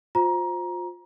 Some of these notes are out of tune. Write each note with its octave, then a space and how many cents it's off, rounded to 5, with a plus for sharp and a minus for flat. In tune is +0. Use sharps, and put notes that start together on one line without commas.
F4 +30 C5 +0 A#5 +20